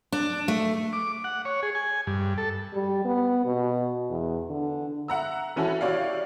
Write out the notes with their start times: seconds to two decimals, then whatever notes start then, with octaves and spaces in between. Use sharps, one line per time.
0.12 D4
0.48 A3
0.93 D6
1.24 F#5
1.45 C#5
1.63 G#4
1.75 G#5
2.07 G2
2.38 A4
2.73 G3
3.05 B3
3.45 B2
4.10 E2
4.49 D3
5.08 E5 F#5 A#5 E6
5.56 E3 C#4 E4 F#4 A4
5.81 E4 F#4 G4 C#5 D5 F5